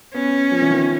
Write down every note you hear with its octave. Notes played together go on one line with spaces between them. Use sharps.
B3 C#4
F3
E3
D#3